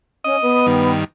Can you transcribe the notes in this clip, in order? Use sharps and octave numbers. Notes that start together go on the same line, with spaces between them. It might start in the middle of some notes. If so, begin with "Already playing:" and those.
C#4 D#5 D#6
B3
G2 D#3